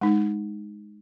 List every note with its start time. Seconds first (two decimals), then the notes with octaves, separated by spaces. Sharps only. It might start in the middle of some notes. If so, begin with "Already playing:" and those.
0.01 G#3 D#4